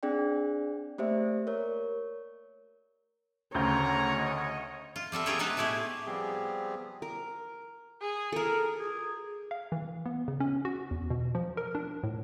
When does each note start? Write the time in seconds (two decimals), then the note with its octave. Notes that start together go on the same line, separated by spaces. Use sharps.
0.03 C4 D4 G#4 D5 G5
0.98 A3 A#3 G4 C5 D5 E5
1.47 A#4 C#5
3.55 D2 C#3 C#5 A#5 G6
4.18 D#5
4.96 F4
5.12 G3 C4 A4 E5
5.26 F4 G4 G#4 A#4 C#5 G5
5.39 G#3 B3 D#4 B4 C5 E5
5.57 A2 A3 E4 G4 G#4
6.06 F3 G3 B3 C4 G4 G#4
7.02 A#4
8.01 G#4
8.32 A4 A#4
8.79 G#4
9.51 F5
9.72 E3
10.06 B3
10.28 C#3
10.40 C#4
10.65 F#4
10.91 E2
11.10 B2
11.35 F3
11.57 A#4
11.75 D4
12.03 A2